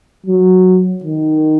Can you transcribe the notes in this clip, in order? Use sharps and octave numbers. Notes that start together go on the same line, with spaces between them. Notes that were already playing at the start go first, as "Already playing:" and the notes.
F#3
D#3